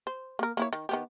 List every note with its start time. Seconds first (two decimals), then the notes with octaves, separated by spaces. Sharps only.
0.07 C5
0.39 A#3 A#4
0.57 A#3 E4 C#5
0.73 D#3
0.89 D#3 B3 G4